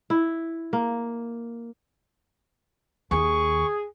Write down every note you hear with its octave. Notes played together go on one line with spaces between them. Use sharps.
E4
A#3
D#2 G#4 C#6